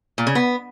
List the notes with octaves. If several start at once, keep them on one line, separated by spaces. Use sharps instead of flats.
A#2
C#3
B3